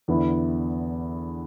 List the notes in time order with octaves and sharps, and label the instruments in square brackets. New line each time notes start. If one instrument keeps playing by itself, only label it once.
[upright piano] E2 D3 B3 E4